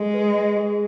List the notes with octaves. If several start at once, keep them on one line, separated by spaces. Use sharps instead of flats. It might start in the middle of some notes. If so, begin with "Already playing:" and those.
Already playing: G#3 G#4 A4
B4
G#4
G#4